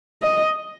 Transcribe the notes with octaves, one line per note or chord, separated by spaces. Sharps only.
D#5